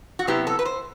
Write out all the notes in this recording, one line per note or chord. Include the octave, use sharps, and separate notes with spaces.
F#4
C3 F#3 B3 E4 G4
A4
B4
C5